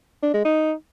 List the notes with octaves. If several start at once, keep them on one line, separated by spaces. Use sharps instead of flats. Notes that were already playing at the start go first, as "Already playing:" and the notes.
D4
G#3
D#4